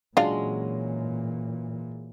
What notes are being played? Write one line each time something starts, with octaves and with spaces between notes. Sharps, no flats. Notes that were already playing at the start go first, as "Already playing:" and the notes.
A#2 E3 F#3 G#3 C#4 D4 F4 F5